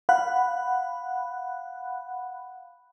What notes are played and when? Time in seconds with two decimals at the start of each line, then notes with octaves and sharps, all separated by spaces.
0.09 F5 F#5 B5 F#6